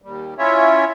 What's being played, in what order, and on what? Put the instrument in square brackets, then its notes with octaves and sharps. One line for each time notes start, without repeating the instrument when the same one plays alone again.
[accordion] D#2 G3
C#4 E4 F4 C#5 E5